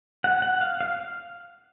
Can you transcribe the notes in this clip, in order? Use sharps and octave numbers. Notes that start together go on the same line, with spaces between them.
F#5
F#5
F5
F5